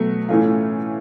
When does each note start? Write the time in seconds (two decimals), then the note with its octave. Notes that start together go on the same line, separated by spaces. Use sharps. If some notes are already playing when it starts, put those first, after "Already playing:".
Already playing: B2 F#3 A3
0.29 A2 E3 A3 C#4 F4